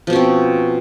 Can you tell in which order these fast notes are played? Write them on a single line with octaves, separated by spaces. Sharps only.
F3 B2 C#4 C4